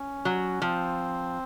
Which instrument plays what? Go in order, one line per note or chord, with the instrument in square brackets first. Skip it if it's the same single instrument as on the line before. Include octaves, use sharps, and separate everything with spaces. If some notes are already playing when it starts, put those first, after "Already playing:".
Already playing: [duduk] C#4
[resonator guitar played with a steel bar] F#3
[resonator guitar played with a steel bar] F3 [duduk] C4